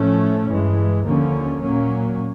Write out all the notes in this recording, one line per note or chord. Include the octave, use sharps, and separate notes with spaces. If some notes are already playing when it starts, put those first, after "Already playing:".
Already playing: A2 F3 A3 C#4
G2 E3 G#3
D#2 D3 F3 A#3 C#4
A#2 F#3 A#3 C#4